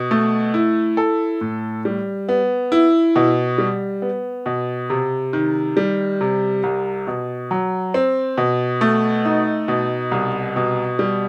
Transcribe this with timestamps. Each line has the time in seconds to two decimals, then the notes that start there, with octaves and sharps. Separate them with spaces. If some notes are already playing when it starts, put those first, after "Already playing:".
Already playing: B2
0.11 A3
0.54 E4
0.97 A4
1.41 A2
1.85 G3
2.29 B3
2.72 E4
3.16 B2
3.58 G3
4.02 B3
4.46 B2
4.90 C3
5.33 D#3
5.77 G3
6.21 C3
6.63 C2
7.07 B2
7.51 F#3
7.94 C4
8.38 B2
8.81 A3
9.25 D#4
9.68 B2
10.11 C2
10.56 B2
10.99 G3